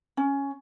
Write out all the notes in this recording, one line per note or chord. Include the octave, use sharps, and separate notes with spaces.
C#4